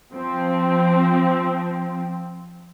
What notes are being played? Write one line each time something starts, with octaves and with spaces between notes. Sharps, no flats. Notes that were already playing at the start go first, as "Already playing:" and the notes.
F3 C4